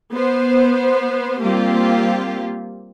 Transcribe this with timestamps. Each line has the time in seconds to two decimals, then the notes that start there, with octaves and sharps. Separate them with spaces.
0.14 B3 C5
1.42 G3 A#3 C4 F4 G4